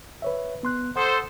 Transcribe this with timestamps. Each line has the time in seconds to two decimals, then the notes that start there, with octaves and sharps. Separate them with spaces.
0.22 B4 C#5 E5
0.63 B3 C6 F#6
0.96 A4 C5 F#5 C6 D#6